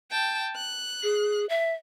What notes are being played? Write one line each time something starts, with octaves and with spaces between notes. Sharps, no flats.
G5 A5
F#6
G#4
E5